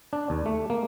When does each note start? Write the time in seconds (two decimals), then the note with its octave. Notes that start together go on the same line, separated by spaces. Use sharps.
0.13 D4
0.30 D#2
0.46 A3
0.70 A#3